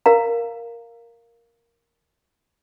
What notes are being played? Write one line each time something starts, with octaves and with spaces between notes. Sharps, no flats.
A#4 F5 A#5